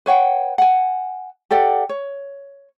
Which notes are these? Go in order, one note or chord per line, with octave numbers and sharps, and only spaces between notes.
B4 C#5 F#5 G5
F#5 G#5
G4 A4 D5 F#5
C#5